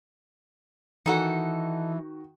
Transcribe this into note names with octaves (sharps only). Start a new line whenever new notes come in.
D#3 E3 D#4 F#4 A4 F#5